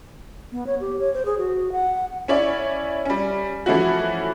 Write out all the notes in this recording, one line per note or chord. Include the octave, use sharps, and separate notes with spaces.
B3
C#5
G4
C#5
C5
G#4
F#4
F#5
C#4 E4 C#5 D5
G3 C#4
E3 F3 A3 C#4 E4 F#4